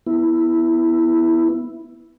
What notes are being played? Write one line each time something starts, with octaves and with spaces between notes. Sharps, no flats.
B3 E4